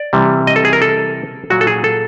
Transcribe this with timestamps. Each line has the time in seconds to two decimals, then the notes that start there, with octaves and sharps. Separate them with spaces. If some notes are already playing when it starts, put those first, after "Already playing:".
Already playing: D5
0.13 C3 E3 G3
0.47 D#5
0.56 A4
0.65 G#4
0.73 A#4
0.82 A4
1.50 A#2 F#3 F#4
1.61 A4
1.67 G#4
1.84 A4